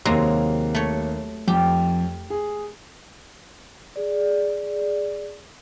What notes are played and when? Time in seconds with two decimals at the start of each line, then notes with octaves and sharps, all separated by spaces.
0.05 D#2 C3 F#3 G#3 A#3 A#5
0.75 A3 C#5
1.48 F2 G4
2.30 G#4
3.96 G#4 D5